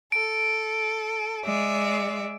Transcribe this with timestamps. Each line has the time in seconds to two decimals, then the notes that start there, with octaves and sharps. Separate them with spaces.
0.12 A4 D7
1.44 G#3 D5 E5